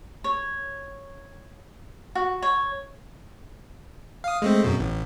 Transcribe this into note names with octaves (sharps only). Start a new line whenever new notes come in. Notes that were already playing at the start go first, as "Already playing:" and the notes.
C#5
F#4
C#5
F5 D#6
G#3 A3 C4
F#2 B2
A1